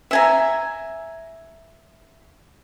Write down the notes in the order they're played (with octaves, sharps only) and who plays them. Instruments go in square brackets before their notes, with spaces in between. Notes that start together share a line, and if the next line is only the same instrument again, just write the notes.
[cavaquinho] E5 G#5 A#5